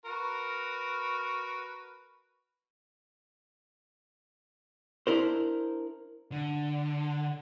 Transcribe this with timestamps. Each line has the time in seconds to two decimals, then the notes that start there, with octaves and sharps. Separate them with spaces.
0.05 F#4 A#4 B4
5.07 D4 E4 A#4 C5
6.32 D3